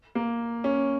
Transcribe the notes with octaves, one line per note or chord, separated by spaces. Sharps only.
A#3
C#4